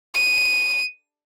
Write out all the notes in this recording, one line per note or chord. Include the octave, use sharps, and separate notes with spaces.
D#7